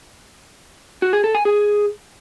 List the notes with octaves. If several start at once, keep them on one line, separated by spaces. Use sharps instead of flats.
F#4
G#4
A4
G#5
G#4